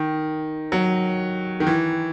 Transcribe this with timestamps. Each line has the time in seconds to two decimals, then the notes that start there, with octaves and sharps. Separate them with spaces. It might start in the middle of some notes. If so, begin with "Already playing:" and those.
Already playing: D#3
0.72 F#3
1.60 D#3
1.67 E3